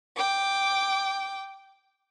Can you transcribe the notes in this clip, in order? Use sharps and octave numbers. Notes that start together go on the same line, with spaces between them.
G5 D6